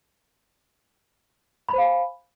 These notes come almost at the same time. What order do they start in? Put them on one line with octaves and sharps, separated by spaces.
B5 C5 F5 G#5